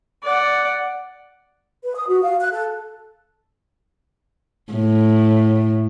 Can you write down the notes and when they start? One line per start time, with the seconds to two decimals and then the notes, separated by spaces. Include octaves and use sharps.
0.23 D5 F#5
1.83 B4
1.95 D#6
2.08 F#4
2.22 F5
2.40 F#6
2.52 A4
4.73 A2